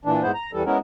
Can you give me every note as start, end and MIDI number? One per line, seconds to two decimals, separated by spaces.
0.05 0.22 46
0.05 0.22 52
0.05 0.22 62
0.23 0.31 44
0.23 0.31 59
0.23 0.31 64
0.23 0.31 72
0.34 0.51 82
0.53 0.63 40
0.53 0.63 52
0.53 0.63 55
0.53 0.63 69
0.66 0.78 56
0.66 0.78 59
0.66 0.78 61
0.66 0.78 64
0.66 0.78 70